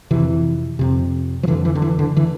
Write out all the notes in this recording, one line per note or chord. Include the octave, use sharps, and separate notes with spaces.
F2 C3 E3
F2 C3
F3
F2 D3 E3
E3
D3
E3
D3
D3 E3